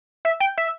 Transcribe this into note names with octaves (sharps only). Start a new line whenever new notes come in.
E5
G5
E5